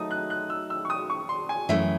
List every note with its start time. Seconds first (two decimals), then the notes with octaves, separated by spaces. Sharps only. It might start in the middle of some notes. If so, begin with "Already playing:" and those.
Already playing: F#3 A3 D#4 A4 D#6
0.11 F#6
0.30 F#6
0.50 E6
0.70 E6
0.85 C#6
0.90 D#6
1.10 C#6
1.29 C6
1.49 G#5
1.69 F#2 E3 A3 E5